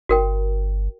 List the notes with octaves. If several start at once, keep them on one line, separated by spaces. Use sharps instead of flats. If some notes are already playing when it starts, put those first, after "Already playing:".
G1 F#4 A#4 G5